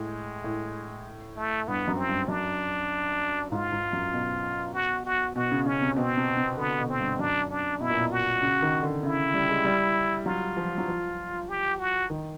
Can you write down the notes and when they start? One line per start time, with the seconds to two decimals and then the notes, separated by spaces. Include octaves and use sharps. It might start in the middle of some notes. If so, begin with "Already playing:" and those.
Already playing: A2 G#3
0.44 A2
1.36 A3
1.68 G2 B3
1.87 F#2
1.98 C4
2.08 G2
2.28 F#2 D4
3.51 G#2 F4
3.72 G#2
3.93 F#2
4.13 B2
4.73 F#4
5.05 F#4
5.35 B2 F#4
5.51 C#3
5.66 C#3 C#4
5.81 C3
5.96 B2 C4
6.17 C3
6.37 C3
6.58 D3 B3
6.79 B2
6.89 C4
6.99 G2
7.19 F#2 D4
7.50 D4
7.80 B2 E4
7.90 A#2
7.98 B2
8.12 F#4
8.42 C#3
8.62 D#3
8.83 D3
9.03 C#3 E4
9.34 G3
9.49 G#3
9.65 G3
10.26 F#3 F4
10.57 F3
10.78 F#3
10.88 F3
11.49 G4
11.79 F#4
12.10 D#3